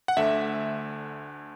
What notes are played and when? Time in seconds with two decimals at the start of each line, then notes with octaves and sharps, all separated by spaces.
0.08 F#5
0.17 D2 D3 A3 E5